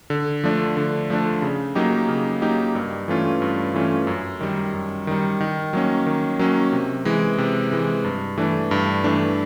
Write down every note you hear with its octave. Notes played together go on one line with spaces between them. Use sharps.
D3
F3 A3 D4
D3
F3 A3 D4
C#3
F#3 A#3 D#4 G4
C#3
F#3 A#3 D#4 G4
G2
E3 A3 C#4 F4
G2
E3 A3 C#4 F4
F#2
D#3 G3
F#2
D#3 G3
D#3
F#3 A#3 C#4
D#3
F#3 A#3 C#4
C3
E3 G#3
C3
E3 G#3
G2
E3 A3 D4
G2
E3 A3 D4